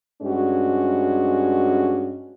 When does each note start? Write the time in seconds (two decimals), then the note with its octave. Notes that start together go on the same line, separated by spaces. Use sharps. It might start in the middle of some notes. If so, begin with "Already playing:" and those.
0.22 G2 G#3 C#4 F#4